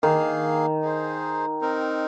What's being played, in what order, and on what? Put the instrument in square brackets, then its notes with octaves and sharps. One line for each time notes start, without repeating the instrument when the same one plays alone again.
[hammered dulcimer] D#3 [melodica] A#3 G#4 F5
[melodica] D#4 G#4 C5
C4 D#4 A#4